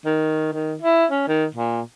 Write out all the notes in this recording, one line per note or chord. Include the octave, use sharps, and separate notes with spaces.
D#3
D#3
E4
C#4
D#3
A#2